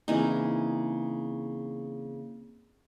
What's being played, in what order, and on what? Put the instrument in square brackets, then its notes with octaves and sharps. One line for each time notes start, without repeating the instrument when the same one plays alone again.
[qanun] C#3 E3 D#4 [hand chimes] A#3 C4 G#4